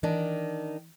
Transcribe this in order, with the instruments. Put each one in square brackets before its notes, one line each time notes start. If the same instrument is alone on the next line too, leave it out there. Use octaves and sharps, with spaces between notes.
[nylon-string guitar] D#3 D4 [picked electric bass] E3